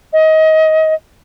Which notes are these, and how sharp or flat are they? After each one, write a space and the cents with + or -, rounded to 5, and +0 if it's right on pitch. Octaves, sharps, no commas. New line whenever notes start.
D#5 +25